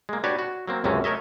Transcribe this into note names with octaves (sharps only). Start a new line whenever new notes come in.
G#3 A#3
D4 F#4 G4 B4 C#5 D5
F#4
F#3 A#3 C4
C#2 F#2 C3 C4 C#4
A3 A#4 C#5 D#5 E5